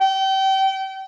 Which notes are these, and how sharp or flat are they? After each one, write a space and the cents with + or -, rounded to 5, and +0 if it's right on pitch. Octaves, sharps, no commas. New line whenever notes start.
G5 -30